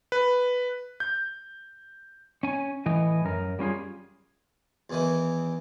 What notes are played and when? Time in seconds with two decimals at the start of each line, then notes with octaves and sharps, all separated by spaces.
0.12 B4
1.00 G6
2.43 C#4 G#5
2.86 A2 E3 D#5 G#5
3.25 F#2 A#4
3.59 G3 C#4 F4 G#4
4.90 E2 D#3 E3